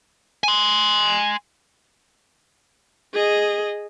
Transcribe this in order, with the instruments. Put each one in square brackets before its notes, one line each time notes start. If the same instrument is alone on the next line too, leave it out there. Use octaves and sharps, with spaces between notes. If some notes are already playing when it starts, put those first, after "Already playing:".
[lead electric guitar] G#5 C6
[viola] G#4 D#5